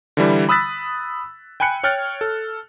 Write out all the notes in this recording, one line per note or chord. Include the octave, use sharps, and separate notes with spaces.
D3 E3 G3 E4
B5 D#6 E6 F#6 A6 B6
G5 G#5 B5 F#6 C#7
C#5 G5 F6 F#6 A6
A4